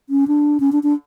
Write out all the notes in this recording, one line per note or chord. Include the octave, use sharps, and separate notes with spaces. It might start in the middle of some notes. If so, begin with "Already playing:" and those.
C#4
D4
C#4
D4
D4